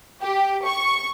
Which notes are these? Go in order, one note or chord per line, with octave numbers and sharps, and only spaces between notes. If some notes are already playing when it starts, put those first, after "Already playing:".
G4
C#6